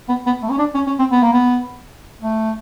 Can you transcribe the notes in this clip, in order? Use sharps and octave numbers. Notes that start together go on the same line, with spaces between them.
B3
B3
A3
C#4
D4
C#4
C#4
C4
B3
A#3
B3
A3